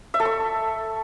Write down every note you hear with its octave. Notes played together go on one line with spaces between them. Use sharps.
E5
A4
C#6